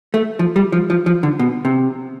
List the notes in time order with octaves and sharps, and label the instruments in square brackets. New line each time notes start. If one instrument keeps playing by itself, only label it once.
[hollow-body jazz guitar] A3
F3
G3
F3
F3
F3
D3
B2
C3